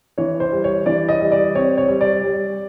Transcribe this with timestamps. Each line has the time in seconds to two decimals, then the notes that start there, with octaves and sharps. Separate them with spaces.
0.18 E3 C#5
0.40 C5
0.52 G3
0.64 C#5
0.86 E3 D5
1.09 D#5
1.21 G3
1.32 D5
1.55 C4 C#5
1.78 C#5
1.88 G3
2.01 D5
2.24 G3